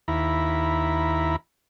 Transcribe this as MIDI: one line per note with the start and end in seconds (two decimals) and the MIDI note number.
0.08 1.36 39
0.08 1.36 64
0.08 1.36 82
0.08 1.36 83